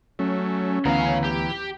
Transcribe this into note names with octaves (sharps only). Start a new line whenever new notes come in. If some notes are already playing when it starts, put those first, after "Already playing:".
F#3 A3 C#4
D2 C#3 E3 B3 F5 A#5
G4